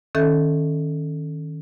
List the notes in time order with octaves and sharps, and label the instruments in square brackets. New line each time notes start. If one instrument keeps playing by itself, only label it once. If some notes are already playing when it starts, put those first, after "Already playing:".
[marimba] D#3 C#4 A4 E5 G6